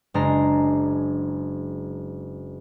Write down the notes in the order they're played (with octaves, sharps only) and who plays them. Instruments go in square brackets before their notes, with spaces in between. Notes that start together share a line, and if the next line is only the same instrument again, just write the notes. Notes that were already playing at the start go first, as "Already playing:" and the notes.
[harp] F#1 G#3 D4 A#5 C7